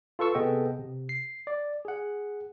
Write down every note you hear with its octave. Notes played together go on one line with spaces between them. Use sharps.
F4 A4 B4 C#6 E6
C3 B3 G#4 A4 D#5 G5
C3
C7
D5
G#4 F#5